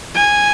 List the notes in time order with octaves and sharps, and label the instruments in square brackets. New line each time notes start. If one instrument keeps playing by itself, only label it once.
[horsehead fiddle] G#5